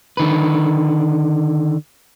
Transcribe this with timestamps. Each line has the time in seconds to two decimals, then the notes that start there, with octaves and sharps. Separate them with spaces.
0.17 D3 D#3 B4